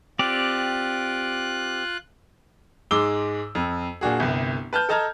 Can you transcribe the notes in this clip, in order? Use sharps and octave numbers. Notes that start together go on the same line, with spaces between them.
C4 F4 G4 D5 F#6
G#2 G#3 D6 E6 G7
F2
A#2 D4 F#4 G#4
G1 C2
B4 A5 F6 G6
A4 D#5 A5 A#5 F6 G#6